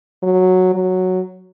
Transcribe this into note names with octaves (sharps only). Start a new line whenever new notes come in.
F#3
F#3